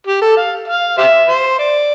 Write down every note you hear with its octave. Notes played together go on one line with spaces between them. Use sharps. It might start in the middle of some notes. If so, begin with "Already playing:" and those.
G4
A4
F5
F5
G4 C5 E5
C5
D5